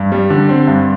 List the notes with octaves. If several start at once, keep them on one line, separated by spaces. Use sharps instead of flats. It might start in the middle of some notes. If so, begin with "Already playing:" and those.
Already playing: G2
G3
D3
C4
G2